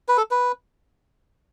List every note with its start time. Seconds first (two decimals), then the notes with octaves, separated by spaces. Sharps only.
0.08 B4
0.17 A4
0.31 B4